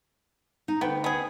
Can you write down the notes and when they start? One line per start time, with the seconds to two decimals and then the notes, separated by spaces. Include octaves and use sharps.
0.68 D#4
0.81 D2 B3 G5
1.04 B3 G#4